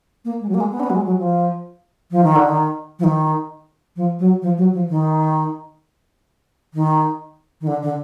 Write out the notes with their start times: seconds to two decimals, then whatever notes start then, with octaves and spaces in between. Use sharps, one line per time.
0.25 A#3
0.41 G#3
0.49 F#3
0.54 A#3
0.60 G#3
0.72 B3
0.80 D4
0.83 B3
0.90 F#3
0.95 G#3
1.06 F#3
1.18 F3
2.11 F3
2.24 D#3
2.36 D3
2.48 D#3
2.99 F3
3.04 D#3
3.96 F3
4.19 F#3
4.42 F3
4.57 F#3
4.73 F3
4.89 D#3
6.74 D#3
7.61 D#3
7.67 D3
7.82 D3